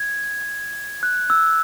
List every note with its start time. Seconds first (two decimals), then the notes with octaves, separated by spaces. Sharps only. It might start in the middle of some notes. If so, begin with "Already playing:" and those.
Already playing: G#6
1.03 F#6
1.30 E6